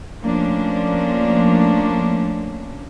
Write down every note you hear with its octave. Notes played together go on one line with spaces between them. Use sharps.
F3 A3 A#3 C#4 D4